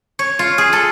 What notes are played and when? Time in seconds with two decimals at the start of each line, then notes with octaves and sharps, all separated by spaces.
0.19 C#5
0.39 F4
0.58 G#4
0.73 A4